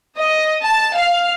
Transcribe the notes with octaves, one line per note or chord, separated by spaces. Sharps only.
D#5
A5
F5